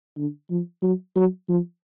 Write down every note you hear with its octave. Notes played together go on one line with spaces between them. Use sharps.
D3
F3
F#3
F#3
F3